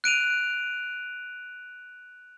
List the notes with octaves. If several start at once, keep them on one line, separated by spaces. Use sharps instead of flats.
F#6 D7 D#7 F7